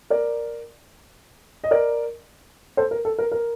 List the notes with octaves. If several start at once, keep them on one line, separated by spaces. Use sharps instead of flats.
A#4 D5
D#5
A#4 D5
A4 C5
A#4
A4
A#4
A#4